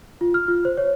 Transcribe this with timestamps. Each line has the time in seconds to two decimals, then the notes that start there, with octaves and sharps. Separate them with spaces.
0.21 F4
0.34 F6
0.48 F4
0.65 C5
0.77 C#5